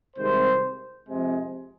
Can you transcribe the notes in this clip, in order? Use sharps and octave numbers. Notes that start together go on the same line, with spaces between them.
C2 C3 D#3 G#3 C5
F2 C3 G#3